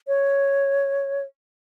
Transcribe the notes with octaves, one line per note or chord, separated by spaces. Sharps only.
C#5